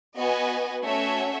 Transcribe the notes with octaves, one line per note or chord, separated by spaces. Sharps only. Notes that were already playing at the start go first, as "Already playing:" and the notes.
B3 F#4 B4 D#5 G#5
A3 C#4 F#4 C#5 E5